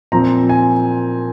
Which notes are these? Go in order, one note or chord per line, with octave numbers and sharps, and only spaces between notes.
A#2 F3 C4 A#5
G#5